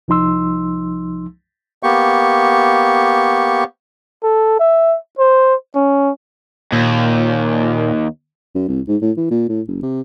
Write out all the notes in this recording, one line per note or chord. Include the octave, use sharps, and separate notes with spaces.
C2 F3 D#4 C6 E6
A#3 B3 G4 C#6
A4
E5
C5
C#4
D#2 A#2
F#2
C2
G#2
A2
E3
A#2
A2
F#1
C3